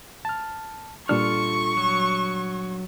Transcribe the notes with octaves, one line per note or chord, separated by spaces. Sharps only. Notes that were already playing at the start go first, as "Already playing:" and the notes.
A5 F6
A#2 G3 D4 F4 A4 C#6 F6
F#3